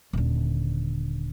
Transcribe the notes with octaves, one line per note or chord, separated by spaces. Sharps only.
D#1 D3